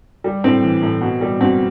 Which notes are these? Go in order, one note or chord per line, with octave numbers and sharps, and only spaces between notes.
G3
A2 C4
E3
A2
B2
G3
B2 C4